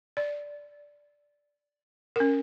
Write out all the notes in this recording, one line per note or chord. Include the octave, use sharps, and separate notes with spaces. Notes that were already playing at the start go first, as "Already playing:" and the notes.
D5
C#4 A#4